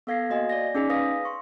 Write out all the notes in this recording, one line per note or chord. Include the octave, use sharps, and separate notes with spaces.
B3 A4 F5 G#6 A#6 C7
A#3 F#4 D#5 F5 G#5
D5 A#6
C#4 D#4 G#4 G#5 B6
B4 F5 D#6 A#6
C6 C#6